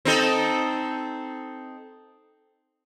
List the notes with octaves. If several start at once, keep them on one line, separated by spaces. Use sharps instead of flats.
C4 D#4 A4